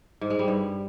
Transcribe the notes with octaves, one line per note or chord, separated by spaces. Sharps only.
G#2
G#3
G3
G2